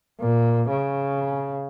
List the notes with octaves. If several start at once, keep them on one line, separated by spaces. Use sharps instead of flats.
A#2
C#3